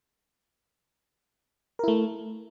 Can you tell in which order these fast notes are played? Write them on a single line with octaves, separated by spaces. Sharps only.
A#4 E4 A3